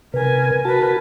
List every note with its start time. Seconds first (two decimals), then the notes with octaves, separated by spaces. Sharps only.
0.14 C3 A#4 B4 G#5
0.65 F#4 A#4 B4 A5